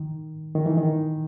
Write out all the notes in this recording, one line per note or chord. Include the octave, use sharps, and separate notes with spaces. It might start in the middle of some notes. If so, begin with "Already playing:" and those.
Already playing: D#3
D#3
E3
D#3